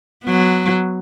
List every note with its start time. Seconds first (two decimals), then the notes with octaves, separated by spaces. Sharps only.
0.24 F#3 B3